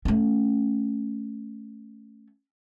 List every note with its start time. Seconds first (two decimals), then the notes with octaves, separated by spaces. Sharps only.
0.05 A3 C#4